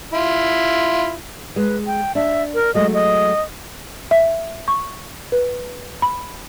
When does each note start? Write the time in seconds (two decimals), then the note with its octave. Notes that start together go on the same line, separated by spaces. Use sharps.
0.14 E4 F4
1.56 G#3 B4
1.87 G5
2.15 D4 E5
2.54 A#4
2.75 F#3 G#3 A3 D#5
2.94 D#5
4.11 E5
4.68 C#6
5.32 B4
6.02 B5